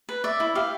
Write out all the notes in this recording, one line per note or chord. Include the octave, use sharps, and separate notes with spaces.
B4
D5 E5
E4
G4 F5